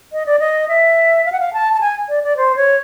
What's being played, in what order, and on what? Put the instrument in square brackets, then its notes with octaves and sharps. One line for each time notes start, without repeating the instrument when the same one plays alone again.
[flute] D#5
D5
D#5
E5
F5
F#5
F5
A5
A5
G#5
D5
D5
C5
C#5